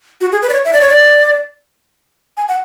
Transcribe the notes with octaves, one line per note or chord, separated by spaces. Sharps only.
F#4
G#4
B4
D5
C#5
E5
D5
C#5
D5
G#5
F#5